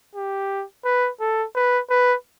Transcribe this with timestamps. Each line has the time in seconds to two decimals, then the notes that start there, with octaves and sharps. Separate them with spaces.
0.16 G4
0.85 B4
1.20 A4
1.55 B4
1.90 B4